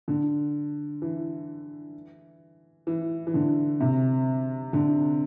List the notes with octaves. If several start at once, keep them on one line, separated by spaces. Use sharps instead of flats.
D3
E3
E3
E3
D3
C3
D3